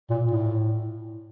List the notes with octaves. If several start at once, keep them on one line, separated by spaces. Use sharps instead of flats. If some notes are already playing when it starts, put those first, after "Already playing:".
A#2
A2